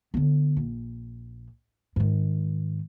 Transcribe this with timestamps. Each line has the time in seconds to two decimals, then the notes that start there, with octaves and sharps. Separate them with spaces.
0.14 D3 B3
0.56 A#1
1.96 G#2 D#3